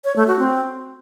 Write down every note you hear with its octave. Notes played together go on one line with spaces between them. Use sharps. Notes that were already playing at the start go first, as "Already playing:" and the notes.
C#5
A3
F#4
C4